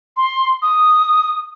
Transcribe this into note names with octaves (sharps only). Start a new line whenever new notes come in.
C6
D#6